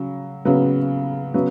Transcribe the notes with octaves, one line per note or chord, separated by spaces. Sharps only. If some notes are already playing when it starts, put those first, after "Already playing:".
Already playing: C#3 F#3
C#3 F#3 B3
C#3 F#3 B3